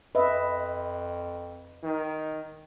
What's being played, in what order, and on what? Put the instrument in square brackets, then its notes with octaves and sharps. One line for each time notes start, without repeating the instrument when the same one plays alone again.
[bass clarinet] F2 [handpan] B4 D#5 E5
[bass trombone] D#3